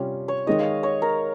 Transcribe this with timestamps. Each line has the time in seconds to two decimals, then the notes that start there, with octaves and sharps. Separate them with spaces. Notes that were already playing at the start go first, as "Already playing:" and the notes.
Already playing: C3 G3 C#4 F4
0.28 C#5
0.47 D#3 G#3 D#4 D#5
0.59 F5
0.83 C#5
1.02 A#4